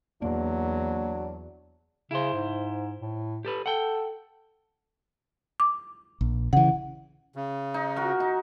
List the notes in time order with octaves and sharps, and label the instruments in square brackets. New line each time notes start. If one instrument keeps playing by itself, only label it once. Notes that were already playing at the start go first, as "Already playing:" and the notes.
[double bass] E2 [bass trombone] F#3 [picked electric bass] A#3 [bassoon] D4
[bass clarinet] C#3 [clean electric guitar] E4 C5
[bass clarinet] G#2
A2
[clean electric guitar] G4 A4 B4
[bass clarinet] A4 [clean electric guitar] F#5 G5
[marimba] D6
[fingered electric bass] A#1
[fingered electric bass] C#3 E3 [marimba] F#5
[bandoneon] C#3
[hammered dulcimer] D#4
F#4 A#4
D#4